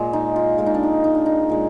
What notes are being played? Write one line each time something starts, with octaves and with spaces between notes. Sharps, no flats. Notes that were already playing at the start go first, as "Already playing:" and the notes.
Already playing: A#2 G#3
D#4
F4
A#2 G#3 F4
D#4
D4
D#4
D#4
D4
D#4
A#2 G#3